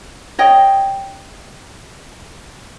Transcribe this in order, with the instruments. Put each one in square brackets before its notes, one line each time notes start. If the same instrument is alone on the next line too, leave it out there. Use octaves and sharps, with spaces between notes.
[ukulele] C#5 D#5 G5